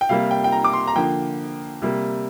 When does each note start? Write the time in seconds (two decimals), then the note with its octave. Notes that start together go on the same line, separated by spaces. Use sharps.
0.01 G5
0.09 C3 G3 A#3 F5
0.31 G5
0.44 G5
0.52 A#5
0.64 D6
0.73 C6
0.87 A#5
0.95 D3 F3 A#3 G5
1.82 C3 G3 A#3